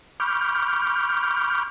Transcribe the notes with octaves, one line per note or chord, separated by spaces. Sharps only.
B5 C#6 D6 F6 G6